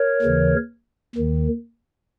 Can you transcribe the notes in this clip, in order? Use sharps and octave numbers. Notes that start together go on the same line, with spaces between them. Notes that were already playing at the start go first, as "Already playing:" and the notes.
Already playing: A#4 C#5
D#2 C#3 E3
D#2 D#3